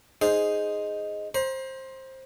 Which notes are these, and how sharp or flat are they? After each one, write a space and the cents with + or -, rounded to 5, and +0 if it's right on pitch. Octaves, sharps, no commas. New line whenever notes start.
D#4 +0 G#4 +0 C5 +0
C5 +15 A#5 +45